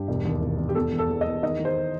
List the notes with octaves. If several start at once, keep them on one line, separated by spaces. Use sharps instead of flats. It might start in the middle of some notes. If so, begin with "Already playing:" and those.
Already playing: G2 G4
E1
D#2
E1
E1
G4
B2 A4
E2
A4
E2
E2 D#5
D#3 D#5
D#3
C5